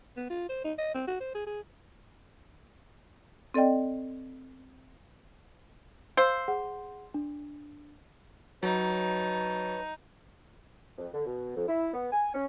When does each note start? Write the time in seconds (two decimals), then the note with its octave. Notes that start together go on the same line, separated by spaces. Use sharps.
0.17 B3
0.30 F4
0.49 C5
0.65 D#4
0.78 D#5
0.94 C4
1.07 F#4
1.20 C5
1.35 G#4
1.47 G#4
3.54 C4 A4 D5 D#5 G5
6.17 C5 F5 E6 C7
6.48 G#4 F#5
7.14 D4
8.63 F#3 D#4 B4 C#5 A5
10.98 F2
11.13 D3
11.26 B2
11.56 F2
11.68 E4
11.94 B3
12.12 G#5
12.34 C#4